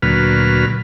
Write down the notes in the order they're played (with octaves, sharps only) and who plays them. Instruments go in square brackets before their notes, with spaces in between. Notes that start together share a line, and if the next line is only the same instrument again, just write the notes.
[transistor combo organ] D2 A#2 F#3 B4 F6